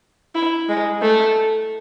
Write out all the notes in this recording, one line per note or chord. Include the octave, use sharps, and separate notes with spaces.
E4
G#3
A3